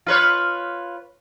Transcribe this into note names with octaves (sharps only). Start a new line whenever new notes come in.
F4 B4 C#5